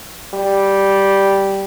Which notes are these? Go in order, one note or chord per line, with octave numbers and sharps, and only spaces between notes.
G3